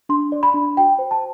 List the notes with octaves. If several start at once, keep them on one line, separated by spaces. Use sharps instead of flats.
D4 C6
D5
B5
D4
F#4 G5
C5
A5